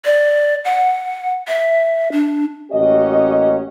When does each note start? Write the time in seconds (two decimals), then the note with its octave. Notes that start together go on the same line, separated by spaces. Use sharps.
0.05 D5
0.65 F#5
1.48 E5
2.12 D4
2.71 A1 A#3 C#4 F#4 G4 D#5